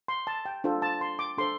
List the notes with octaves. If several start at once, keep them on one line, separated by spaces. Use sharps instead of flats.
C6
A5
G5
D4 F4 A4 C5
A5
C6
D6
D4 A4 C5 C6